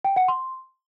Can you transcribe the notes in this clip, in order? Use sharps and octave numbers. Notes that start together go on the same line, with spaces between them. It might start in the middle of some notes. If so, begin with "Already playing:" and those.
G5
F#5
C6